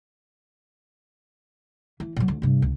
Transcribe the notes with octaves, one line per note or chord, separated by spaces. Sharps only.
E3
A#2 F#3
D2
G2 C3
C#2